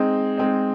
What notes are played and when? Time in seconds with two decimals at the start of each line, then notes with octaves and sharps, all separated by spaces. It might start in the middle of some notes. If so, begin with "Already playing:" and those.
Already playing: G#3 C4 D#4
0.37 G#3 C4 D#4